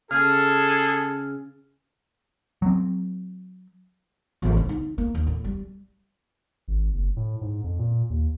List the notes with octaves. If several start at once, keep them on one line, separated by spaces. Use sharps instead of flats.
C#3 G#4 A4 F6
F#3 C4
A1
F#1
D#4
A#3
D#2
A2
G3
G#1
F#1
A2
G#2
F2
A#2
D#2